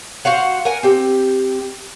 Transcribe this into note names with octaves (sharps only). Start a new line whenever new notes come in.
F#4 C5 F5 F#5
A#4 F#5 G#5
C4 G4